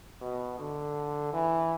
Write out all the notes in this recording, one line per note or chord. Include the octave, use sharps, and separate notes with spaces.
B2
D3
E3